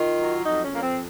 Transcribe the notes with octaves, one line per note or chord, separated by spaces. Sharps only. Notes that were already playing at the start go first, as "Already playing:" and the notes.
Already playing: D#3 F4
F#3
F2 D#4
C#4
F2 A#3
C4